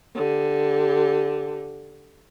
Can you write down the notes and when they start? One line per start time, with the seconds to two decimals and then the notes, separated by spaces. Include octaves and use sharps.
0.15 D3 G4